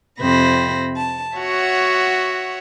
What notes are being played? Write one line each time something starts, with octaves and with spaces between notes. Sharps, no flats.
F2 C3 C5 B5 A#6
A5
F#4 C#5 E5 F#5